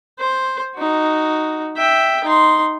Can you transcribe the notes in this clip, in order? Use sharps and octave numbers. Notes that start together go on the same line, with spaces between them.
C5
D#4 F#4
E5 G5
D#4 C6